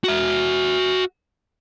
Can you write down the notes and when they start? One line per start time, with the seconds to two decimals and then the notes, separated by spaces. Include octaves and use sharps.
0.04 F#4 E5